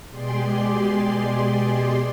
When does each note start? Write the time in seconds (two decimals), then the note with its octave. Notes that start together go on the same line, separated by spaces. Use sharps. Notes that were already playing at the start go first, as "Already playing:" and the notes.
0.11 B2 G#3 G4 G#4 D5 C6